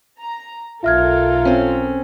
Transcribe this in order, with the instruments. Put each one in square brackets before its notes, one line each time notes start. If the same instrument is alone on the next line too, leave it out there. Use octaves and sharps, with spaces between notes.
[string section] A#5
[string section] B1 A4 A#4 [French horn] F4 [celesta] E5 F6 G#6
[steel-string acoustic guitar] C4 C#4